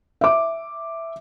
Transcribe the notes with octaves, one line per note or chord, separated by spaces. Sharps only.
E5 D6